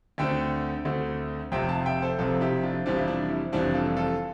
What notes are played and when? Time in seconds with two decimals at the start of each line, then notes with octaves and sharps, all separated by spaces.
0.18 D2 D3 A3 C4 E5 G5
0.85 D2 D3 A3 C4
1.51 F1 F2 C3 F3 C4 E5 G5
1.69 F5 A5
1.85 E5 G5
2.02 A4 C5
2.19 F1 F2 C3 F3 C4 F4 A4
2.41 E4 G4
2.63 D4 F4
2.86 F1 F2 E3 G3 C4 D4 F4
2.98 E4
3.08 D4
3.30 E4
3.52 F1 F2 E3 G3 C4 D4 F4
3.74 F4 A4
3.97 F4 A4